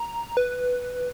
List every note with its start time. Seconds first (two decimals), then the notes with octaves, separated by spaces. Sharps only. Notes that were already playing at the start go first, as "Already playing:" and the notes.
Already playing: A#5
0.37 B4